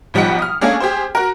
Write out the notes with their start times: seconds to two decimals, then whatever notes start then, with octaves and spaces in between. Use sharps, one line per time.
0.14 B1 F3 G3 D#4 F#5 C#7
0.39 D#6 F6
0.61 A3 A#3 C#4 D4 G#4
0.80 G4 G#4 C5
1.15 F#4 A#4